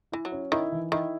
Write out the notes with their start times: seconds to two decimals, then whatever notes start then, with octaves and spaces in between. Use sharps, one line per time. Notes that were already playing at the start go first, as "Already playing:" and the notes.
0.12 E3 E4
0.25 F#3
0.32 C#4
0.52 D#3 E4
0.72 E3
0.92 D#3 E4